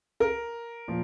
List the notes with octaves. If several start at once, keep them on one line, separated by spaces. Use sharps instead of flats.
A#4
A#2 F3